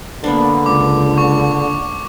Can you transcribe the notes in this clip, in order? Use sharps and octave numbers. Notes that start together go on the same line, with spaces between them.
D3 A#3 B3 D4
C#2 D6
C#6